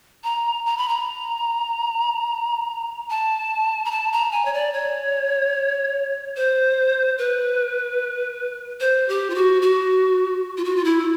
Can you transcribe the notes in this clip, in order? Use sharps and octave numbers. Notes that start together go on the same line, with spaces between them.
A#5
A#5
B5
A#5
A5
A#5
A5
A#5
G#5
C#5
D5
C#5
C5
B4
C5
G4
F4
F#4
F#4
F4
F#4
F4
E4